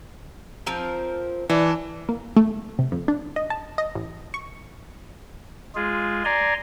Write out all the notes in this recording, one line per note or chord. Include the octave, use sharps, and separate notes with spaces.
F3 C4 A#4
E3 D4
A#3
A3
C3
F2
D4
D#5
A5
D#5
A1
C#6
G#3 F4 G#4
D5 G#5 A#5 C6